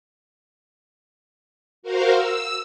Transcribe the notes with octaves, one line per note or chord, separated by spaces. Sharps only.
F#4 A#4 C5 F5
E6